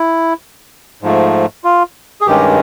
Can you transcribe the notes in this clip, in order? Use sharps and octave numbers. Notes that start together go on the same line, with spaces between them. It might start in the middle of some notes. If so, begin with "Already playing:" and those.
Already playing: E4
G#2 F3 A3
F4
G#4
G2 D#3 G#3 C#4 G4